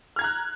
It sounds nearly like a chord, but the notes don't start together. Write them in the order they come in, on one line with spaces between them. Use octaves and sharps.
F6 G#6 A#5 F#6